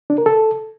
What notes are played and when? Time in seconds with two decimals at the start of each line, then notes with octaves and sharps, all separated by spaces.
0.10 D4
0.18 A#4
0.26 A4